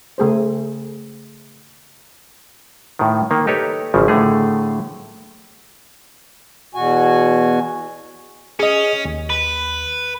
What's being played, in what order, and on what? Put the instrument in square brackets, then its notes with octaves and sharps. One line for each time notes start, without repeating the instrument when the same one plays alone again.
[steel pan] C#3 A3 G#4 C5
[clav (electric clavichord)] A2 D#3
D#3 A#3
D#4 G4 A4 B4 C#5
G#1 C#3 F3
A2 D3 A3 G#4
[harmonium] E2 B2 F#4 G#5
[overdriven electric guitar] C#4 [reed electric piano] G#4 D#5
[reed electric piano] D#2
[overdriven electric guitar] B4